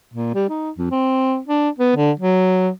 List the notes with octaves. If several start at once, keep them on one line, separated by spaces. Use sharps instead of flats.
A#2
G3
D#4
F2
C4
D4
B3
D3
F#3